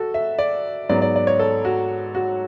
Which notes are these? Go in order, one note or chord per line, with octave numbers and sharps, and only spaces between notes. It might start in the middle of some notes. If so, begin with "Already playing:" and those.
Already playing: F#4 A4
E5
D5
G#2 F#3 B3 D5
D5
D5
C#5
A4
F#4
F#4